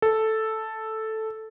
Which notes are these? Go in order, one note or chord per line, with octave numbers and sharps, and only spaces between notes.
A4